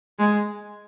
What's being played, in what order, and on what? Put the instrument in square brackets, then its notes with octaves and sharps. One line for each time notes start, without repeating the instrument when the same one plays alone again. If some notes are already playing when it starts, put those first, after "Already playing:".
[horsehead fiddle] G#3